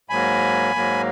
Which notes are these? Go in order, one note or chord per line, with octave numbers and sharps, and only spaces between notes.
G#2 F#3 A#3 G#5 B5
G#2 F#3 A#3